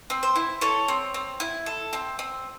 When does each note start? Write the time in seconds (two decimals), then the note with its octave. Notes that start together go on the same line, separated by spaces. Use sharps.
0.10 C4
0.23 C5
0.36 E4
0.61 A4 C#5
0.88 C4
1.14 C4
1.40 E4
1.66 A4
1.93 C4
2.19 C4